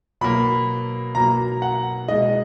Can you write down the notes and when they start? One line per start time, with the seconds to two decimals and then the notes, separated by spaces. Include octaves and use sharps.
0.21 B2 F#3 A#3 B5
1.15 B2 F#3 A#3 A#5
1.62 F#5
2.08 B2 G#3 D#5